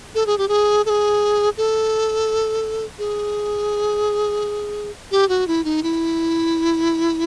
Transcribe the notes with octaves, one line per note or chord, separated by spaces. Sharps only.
A4
G#4
G4
G#4
A4
G#4
A4
G#4
G4
F#4
E4
D#4
E4